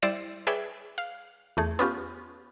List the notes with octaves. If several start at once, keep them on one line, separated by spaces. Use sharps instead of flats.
G3 E4 C5 D5 A6 E7
G#4 B4 C#5 D5 E5 G5
F5
E2 A3 G#4
B3 C#4 F4 G4